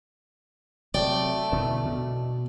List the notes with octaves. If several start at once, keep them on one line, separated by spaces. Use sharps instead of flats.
C3 F#3 A3 D5 G5
B2 D3 E3
B2